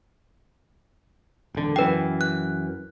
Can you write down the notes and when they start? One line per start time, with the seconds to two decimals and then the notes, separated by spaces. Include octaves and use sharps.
1.55 E1 D3
1.76 F#2 E3 B4 G5
2.21 F#6